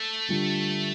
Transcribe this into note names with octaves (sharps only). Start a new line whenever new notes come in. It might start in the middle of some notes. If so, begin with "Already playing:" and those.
Already playing: A3
D3 G3 D4 F4